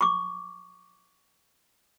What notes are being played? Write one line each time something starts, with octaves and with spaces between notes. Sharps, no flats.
C#6 D6